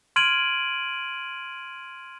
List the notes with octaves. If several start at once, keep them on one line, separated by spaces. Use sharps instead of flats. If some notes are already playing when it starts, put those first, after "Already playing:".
C6 F6 G#6 D7 D#7 F#7